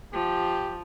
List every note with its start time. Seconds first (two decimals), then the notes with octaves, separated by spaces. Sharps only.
0.13 F3 G4